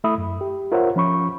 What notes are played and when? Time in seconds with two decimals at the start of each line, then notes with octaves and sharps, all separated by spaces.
0.04 A3 E4 E5 B5 D#6
0.18 F#2
0.41 G4
0.72 F4 A#4 C5 C#5 E5 F#5
0.96 F3 C#4 B5 C#6